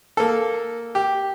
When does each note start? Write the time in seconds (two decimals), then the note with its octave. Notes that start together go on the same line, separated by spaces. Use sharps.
0.17 A#3 A4
0.95 G4